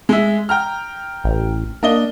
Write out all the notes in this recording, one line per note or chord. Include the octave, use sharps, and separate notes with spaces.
G#3 E5
G5 A#5 F6
A1
A#3 D4 D#5 G7